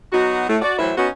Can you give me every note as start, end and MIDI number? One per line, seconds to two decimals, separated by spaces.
0.13 0.48 54
0.13 0.48 59
0.13 0.48 63
0.13 0.48 66
0.48 0.57 45
0.48 0.57 57
0.61 0.76 66
0.61 0.76 74
0.79 0.91 45
0.79 0.91 52
0.79 0.91 54
0.79 0.91 71
0.79 0.91 72
0.79 0.91 76
0.98 1.08 59
0.98 1.08 61
0.98 1.08 63
0.98 1.08 66